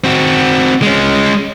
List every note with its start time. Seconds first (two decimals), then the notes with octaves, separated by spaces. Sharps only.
0.04 C4 F#4
0.82 G#3 C#4